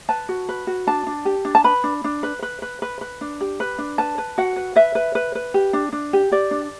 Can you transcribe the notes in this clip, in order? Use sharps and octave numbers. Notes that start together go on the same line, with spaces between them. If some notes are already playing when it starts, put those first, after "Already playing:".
B4 A5
F#4
B4
F#4
D4 A5
D4
G4
D4
A5
B4 B5
D4
D4
B4
B4
B4
B4
B4
D4
G4
B4
D4
B4 A5
B4
F#4 F#5
B4
B4 E5
B4
B4
B4
G4
D4
D4
G4
G4 D5
D4